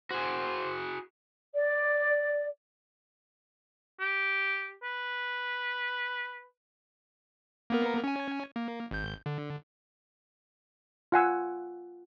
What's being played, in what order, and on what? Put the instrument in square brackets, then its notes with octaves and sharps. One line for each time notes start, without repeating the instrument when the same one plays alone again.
[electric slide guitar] F#4 G#4 [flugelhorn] C5
[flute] D5
[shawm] G4
B4
[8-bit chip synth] A#3 B3 A#4
C#4 G#5
A#3
G#1 G6
D3
[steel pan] F4 F#5 G#5 E6